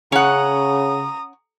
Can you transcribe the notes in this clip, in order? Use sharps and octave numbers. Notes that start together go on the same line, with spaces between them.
C#3 C#4 F#5 A#5 D#6